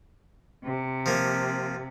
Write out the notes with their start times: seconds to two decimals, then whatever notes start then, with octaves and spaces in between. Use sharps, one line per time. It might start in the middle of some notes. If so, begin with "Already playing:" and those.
0.64 C3
1.06 F3 A#3